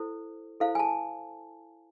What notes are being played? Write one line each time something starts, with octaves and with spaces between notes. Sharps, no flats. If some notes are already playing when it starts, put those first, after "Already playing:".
Already playing: E4 A4 C5
E4 A4 C5 F5
G#5
A5